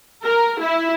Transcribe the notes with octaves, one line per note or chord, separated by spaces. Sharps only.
A#4
E4